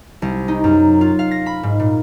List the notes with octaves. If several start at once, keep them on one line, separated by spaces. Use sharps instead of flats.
C2
D#4
F#2
F4
F5
A#6
B5
G#2
A#2